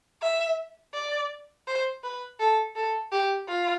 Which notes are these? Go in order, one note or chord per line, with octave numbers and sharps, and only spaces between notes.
E5
D5
C5
B4
A4
A4
G4
F4